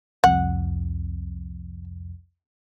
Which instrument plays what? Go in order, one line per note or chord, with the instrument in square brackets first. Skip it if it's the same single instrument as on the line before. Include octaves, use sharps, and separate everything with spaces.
[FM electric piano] C2 F2 [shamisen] F#5